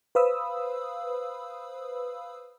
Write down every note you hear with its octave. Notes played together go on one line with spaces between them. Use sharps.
B4 C5 F5 B5 D#6 E6